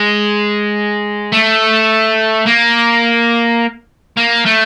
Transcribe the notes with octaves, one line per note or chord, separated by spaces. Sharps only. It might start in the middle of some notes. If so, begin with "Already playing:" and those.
Already playing: G#3
A3
A#3
A#3
A3